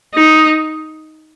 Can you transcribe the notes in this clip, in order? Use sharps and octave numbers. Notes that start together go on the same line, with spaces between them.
D#4